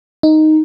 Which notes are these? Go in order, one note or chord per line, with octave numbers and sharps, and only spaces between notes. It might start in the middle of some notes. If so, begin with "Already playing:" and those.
D#4